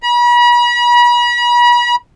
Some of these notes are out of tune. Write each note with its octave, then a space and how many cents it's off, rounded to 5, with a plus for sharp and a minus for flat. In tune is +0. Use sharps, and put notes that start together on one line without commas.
B5 -40